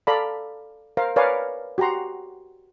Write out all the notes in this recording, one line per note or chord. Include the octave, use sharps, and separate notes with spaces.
A4 D5 F5 A#5 B5
A#4 C5 F5
A#4 B4 C#5 D5 F5 G#5
F#4 G4 F#5 A#5 C6